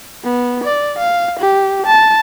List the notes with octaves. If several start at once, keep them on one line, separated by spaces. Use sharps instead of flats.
B3
D5
F5
G4
A5